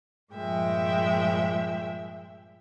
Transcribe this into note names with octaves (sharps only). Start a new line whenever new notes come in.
G2 A#2 F3 G#3 E5 G5